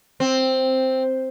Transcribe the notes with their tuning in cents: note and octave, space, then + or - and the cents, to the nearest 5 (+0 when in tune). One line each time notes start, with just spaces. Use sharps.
C4 +0